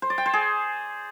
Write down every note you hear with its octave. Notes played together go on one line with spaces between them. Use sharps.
C5
D5
G5
C5
G#4